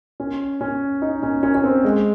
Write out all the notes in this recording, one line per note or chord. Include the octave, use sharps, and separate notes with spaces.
C#4
C#4
D#4
C#4
C#4
C#4
C4
G#3